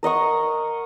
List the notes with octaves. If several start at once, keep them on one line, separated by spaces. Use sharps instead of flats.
A#4 D#5 F#5 C#6